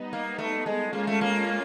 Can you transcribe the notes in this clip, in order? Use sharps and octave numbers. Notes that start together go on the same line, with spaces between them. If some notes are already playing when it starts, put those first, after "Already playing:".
Already playing: G3 B3 D#4
A#3
A3
G#3
G#3 A#3 C#4 F4
A3
A#3